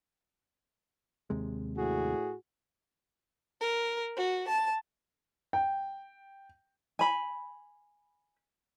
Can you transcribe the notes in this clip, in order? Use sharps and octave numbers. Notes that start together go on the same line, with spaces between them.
D#2 C3 G#3
A2 F#4 G#4
A#4
F#4
A5
G5
G#5 B5